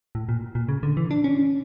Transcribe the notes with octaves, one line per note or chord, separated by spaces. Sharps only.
A2
A#2
A#2
C#3
D3
E3
D4
C#4